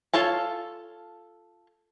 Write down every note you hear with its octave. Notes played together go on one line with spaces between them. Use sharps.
F4 A4 C#5 A5